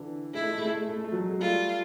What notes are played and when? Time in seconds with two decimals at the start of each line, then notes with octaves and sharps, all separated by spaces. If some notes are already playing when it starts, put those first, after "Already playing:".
Already playing: D3 E3
0.34 G#3 E4
0.42 A3
0.50 G#3
0.58 A3
0.65 G#3
0.73 A3
0.81 G#3
0.89 A3
0.96 G#3
1.04 A3
1.12 F#3 G#3
1.30 G#3
1.40 G3 A3 F4